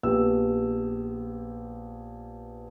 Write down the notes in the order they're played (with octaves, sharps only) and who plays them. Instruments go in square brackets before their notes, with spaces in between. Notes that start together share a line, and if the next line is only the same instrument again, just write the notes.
[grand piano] A#1 B3 G4 E6